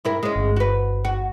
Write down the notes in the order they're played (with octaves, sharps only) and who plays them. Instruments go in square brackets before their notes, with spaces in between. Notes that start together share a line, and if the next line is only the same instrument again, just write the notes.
[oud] G2 E4 A#4
G#3 C#4
[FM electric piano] G1
[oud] F#4 B4
F#4